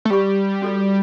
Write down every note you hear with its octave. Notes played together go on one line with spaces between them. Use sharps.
A3
G3 G4 C#5 G5 C#6
C#4 F#4 A4 D5